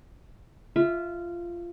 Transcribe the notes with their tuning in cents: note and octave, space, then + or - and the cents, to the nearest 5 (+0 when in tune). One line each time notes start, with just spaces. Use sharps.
F4 -15 E5 +0